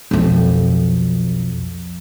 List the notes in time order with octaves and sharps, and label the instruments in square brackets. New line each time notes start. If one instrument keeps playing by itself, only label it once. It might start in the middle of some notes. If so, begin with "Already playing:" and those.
[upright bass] B1 F2